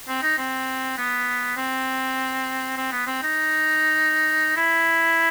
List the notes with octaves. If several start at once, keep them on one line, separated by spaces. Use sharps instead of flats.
C4
D#4
C4
B3
C4
C4
B3
C4
D#4
E4